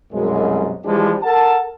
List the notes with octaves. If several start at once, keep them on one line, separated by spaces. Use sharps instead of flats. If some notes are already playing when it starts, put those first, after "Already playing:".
C2 F#2 B2 G#3
E3 F3 G3 G#3 D4 G4
A4 A#4 F#5 A5